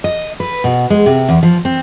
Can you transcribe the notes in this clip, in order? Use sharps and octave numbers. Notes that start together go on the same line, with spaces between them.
D#5
B4
B2
G#3
C3
E2
F3
C4